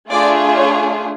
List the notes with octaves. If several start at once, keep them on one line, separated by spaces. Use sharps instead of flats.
A3 D4 F4 G#4 D5
C#5